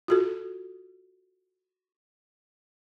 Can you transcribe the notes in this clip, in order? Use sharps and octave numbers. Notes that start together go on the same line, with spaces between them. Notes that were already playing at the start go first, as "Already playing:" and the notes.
F4 F#4 A4